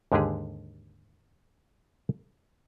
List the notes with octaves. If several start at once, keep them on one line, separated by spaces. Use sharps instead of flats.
D#2 G#2 D3 G#3 G4 G#4